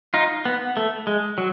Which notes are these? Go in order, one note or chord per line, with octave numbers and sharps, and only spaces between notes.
D#4 F4
B3
A3
G#3
F#3